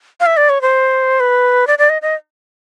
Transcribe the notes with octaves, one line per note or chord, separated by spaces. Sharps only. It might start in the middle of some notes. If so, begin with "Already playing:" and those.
F5
E5
D5
C#5
C5
B4
D5
D5
D#5
D#5